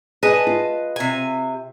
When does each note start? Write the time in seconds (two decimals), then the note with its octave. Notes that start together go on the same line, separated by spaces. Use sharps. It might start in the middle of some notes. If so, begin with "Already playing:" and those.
0.23 G#4 B4 D#5 A5
0.47 F4
0.96 C3 G#5